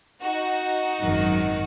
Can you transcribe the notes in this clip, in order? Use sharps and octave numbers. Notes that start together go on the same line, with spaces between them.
D#4 F#4
G#1 F#2 D#3 F#3